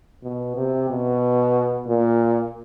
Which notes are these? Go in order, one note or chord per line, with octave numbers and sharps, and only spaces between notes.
B2
C3
B2
A#2